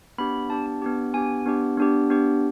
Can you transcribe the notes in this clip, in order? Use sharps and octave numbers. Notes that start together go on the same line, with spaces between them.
B3 D4 G4 B5
B3 D4 G4 A5
A5
B3 D4 G4
B3 D4 G4 G#5
B3 D4 G4
B3 D4 G4
B3 D4 G4